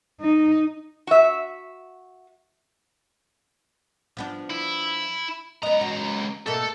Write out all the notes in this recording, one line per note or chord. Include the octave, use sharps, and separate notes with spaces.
D#4
F#4 E5
F3 B3 D4
E4
C#2 B3 D#5 A#5
F#4
B2 A3 A#3 A4